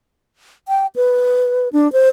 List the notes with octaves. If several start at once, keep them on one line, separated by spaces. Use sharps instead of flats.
G5
B4
D4
C5